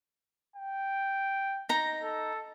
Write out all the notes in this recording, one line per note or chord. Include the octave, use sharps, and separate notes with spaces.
G5
D#4 A#5
A4